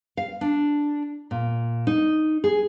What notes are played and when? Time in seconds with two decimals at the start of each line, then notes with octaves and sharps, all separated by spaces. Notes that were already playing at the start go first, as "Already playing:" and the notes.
0.17 F5
0.41 D4
1.31 A#2
1.87 D#4
2.44 G#4